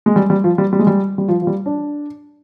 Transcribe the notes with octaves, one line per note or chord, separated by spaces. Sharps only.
G#3
G3
G3
F3
G3
G3
G#3
G3
G3
F3
F3
G3
D4